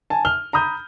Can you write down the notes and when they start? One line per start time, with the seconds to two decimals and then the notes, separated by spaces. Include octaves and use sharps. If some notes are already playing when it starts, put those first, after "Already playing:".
0.10 G#5 A5
0.25 F6 G7
0.53 A#5 B5 D#6 G6